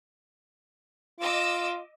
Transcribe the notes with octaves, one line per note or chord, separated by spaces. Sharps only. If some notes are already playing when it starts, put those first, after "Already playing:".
F4 D#5 D6 E6